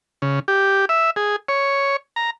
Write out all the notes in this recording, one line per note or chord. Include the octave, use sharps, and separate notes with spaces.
C#3
G4
E5
G#4
C#5
A#5